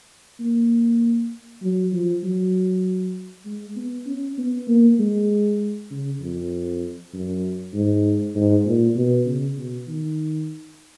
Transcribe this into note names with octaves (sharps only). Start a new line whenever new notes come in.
A#3
F#3
F3
F#3
G#3
B3
C#4
B3
A#3
G#3
C#3
F2
F#2
G#2
G#2
A#2
B2
C#3
B2
D#3